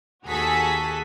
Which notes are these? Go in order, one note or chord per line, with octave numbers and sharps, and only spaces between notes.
D#2 F#4 G#4 A4 G#5 B6